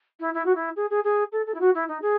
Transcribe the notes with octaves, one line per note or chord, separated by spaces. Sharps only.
E4
E4
F#4
E4
G#4
G#4
G#4
A4
A4
E4
F#4
E4
D#4
G#4